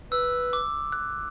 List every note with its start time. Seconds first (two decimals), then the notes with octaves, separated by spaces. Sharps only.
0.12 B4 E6
0.53 D6
0.92 F#6